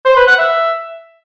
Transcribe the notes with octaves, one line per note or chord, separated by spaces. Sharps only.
C5
B4
F#5
E5